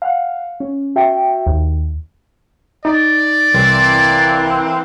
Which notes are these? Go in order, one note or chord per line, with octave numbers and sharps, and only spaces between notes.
F5 F#5
C#4
F#4 E5 G5
D#2
D#4 D5
C2 E3 A#3 C4